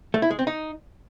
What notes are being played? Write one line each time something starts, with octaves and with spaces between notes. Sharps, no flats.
A3
E4
G#3
C4
D#4